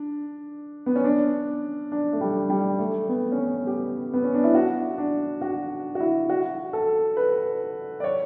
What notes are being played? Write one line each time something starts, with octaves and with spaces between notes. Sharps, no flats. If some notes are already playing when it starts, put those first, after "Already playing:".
Already playing: D4
B3
C#4
D4
D4
A3
G3
G3
A3
B3
C#4
B3
G4
B3
C#4
D4
E4
F#4
D4
F#4
F#4
E4
F#4
A4
B4
D5
C#5